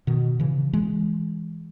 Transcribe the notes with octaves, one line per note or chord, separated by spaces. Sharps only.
B2 D#3
C#3 E3
E3 G#3